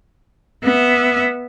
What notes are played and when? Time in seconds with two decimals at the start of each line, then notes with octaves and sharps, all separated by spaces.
0.63 B3 E5